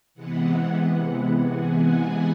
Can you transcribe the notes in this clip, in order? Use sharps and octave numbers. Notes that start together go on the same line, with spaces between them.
C3 E3 G#3 B3 F#5
G#5